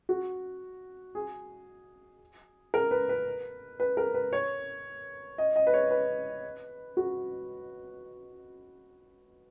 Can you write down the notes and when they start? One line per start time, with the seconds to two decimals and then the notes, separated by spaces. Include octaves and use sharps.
0.09 F#4
1.15 G#4
2.74 A#4
2.91 B4
3.09 B4
3.80 B4
3.97 A#4
4.14 B4
4.33 C#5
5.38 D#5
5.56 D#5
5.67 B4
5.74 C#5
5.91 B4
6.97 F#4